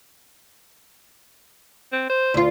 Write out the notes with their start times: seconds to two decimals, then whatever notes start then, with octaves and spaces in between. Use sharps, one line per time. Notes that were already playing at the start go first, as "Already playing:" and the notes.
1.92 C4
2.10 C5
2.34 D2 F4